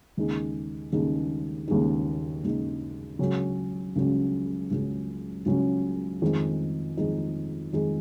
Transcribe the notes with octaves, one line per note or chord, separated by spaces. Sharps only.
D#2 C#3 G#3 D#4
D#2 C#3 G#3 D#4
D#2 C#3 G#3 D#4
D#2 C#3 G#3 D#4
C#2 C#3 F#3 C#4
C#2 C#3 F#3 C#4
C#2 C#3 F#3 C#4
C#2 C#3 F#3 C#4
F2 D#3 G#3 D#4
F2 D#3 G#3 D#4
F2 D#3 G#3 D#4